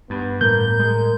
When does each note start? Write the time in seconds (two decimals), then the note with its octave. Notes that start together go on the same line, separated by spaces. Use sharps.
0.10 G2 B3
0.41 A2 G3 A#3 A#4 G6
0.80 G#3 A#4